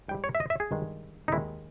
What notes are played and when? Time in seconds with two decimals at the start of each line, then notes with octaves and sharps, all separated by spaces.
0.08 G#2 G3 G5
0.24 C#5
0.35 E5
0.40 D#5
0.50 E5
0.60 G#4
0.71 G2 D#3 G#3
1.28 D#4
1.32 D#2 D#3 G#3 E4